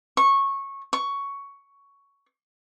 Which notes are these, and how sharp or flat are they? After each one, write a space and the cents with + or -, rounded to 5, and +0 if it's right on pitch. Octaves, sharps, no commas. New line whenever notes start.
C#6 -15
C#6 +10